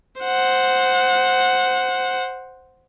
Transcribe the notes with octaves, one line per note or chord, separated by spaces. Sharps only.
C5 F#5